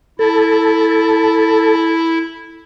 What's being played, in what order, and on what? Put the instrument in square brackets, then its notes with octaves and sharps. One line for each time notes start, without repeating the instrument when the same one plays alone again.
[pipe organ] E4 [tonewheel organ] A4